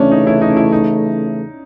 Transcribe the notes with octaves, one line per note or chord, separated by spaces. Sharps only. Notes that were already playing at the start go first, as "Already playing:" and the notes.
Already playing: C#3 E3 A3 C#4 D4
D#4
E4
D#4
E4
D#4